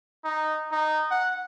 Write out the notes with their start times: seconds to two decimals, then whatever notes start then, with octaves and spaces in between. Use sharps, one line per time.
0.25 D#4
0.71 D#4
1.11 F#5